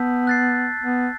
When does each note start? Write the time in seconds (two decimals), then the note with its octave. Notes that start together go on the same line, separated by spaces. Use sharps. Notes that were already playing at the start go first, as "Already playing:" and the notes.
Already playing: B3 A5 E6 G6 B6
0.27 F#6 A6 C7
0.83 B3